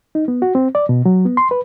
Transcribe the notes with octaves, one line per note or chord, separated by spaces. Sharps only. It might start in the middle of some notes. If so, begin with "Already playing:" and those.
D#4
B3
F#4
C4
D5
B2
F#3
B3
C6
B4